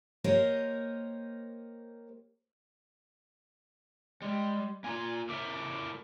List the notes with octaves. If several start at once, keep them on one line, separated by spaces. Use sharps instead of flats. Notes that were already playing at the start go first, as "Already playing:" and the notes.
A#3 G4 A#4 C5 C#5 D#5
G3 G#3
A#3 F4 A#4 G#5
A2 A#4 E5 D6